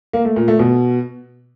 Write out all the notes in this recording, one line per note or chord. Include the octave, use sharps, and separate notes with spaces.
A#3
A3
A#2
A3
B2